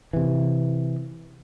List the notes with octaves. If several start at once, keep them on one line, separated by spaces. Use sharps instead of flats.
C3 E3